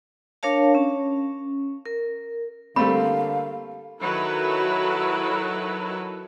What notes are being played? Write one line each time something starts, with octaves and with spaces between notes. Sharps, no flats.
D4 A#4 C#5 F5 A5
C#4
A#4
D3 G3 A3 A#3 C4 A4 F5 B5
D#3 F#3 E4 A4 B4